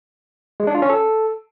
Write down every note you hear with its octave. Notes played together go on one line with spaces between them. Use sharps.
G#3
D4
F4
C#4
A4